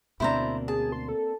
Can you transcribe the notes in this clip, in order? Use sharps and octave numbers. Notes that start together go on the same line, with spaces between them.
D2 B2 A#3 C4 D4 E4 C5 A#5
G#4 A5
C6
A4